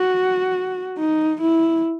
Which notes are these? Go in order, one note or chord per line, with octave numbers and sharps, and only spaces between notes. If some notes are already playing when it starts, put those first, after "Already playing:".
Already playing: F#4
D#4
E4